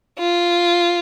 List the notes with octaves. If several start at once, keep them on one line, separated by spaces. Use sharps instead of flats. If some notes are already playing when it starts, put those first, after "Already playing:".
F4